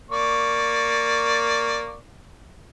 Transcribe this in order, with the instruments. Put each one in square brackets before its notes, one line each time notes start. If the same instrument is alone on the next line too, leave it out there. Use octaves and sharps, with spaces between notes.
[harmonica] A#3 D5 C#6